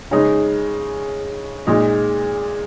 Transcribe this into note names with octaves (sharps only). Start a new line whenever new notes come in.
C#3 G#3 D#4
A#2 G#3 D#4